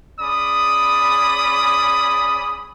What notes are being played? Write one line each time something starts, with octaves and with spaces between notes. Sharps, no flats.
C#4 G#4 D5 B5 D6 D#6